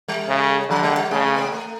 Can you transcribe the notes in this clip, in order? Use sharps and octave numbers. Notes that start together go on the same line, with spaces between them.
G3
C#3
D3 F3
G3
G3
C#3 G#3
B3
A#3
A3